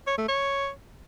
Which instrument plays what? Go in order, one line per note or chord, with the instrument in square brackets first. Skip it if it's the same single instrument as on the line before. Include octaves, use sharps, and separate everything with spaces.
[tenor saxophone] C#5
A3
C#5